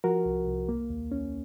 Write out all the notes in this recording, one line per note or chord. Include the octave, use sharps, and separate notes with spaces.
F3 F#4 A#4
C2
C2
A#3
D#2
C#4